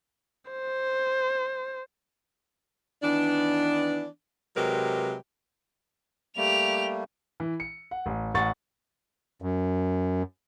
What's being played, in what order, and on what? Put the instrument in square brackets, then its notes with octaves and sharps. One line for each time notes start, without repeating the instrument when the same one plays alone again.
[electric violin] C5
[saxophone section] D#3 E3 B3 D4
C3 F#3 G#3 G4 A#4 B4
[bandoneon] G3 A3 A#3 [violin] G4 F7
[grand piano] E3
C#7
F#5
A1
A1 F#5 C#6 A6
[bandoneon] F#2